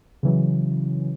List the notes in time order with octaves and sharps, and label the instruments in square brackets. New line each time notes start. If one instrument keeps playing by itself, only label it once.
[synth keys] C#3 E3 F#3